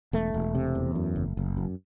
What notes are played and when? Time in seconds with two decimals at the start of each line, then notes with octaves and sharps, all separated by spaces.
0.13 E1 A3
0.34 E1
0.55 C3
0.75 E2
0.95 F#2
1.16 F#1
1.37 F#1
1.57 F#2